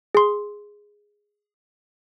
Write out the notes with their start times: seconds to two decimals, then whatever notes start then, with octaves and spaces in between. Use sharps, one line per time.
0.15 G#4 C6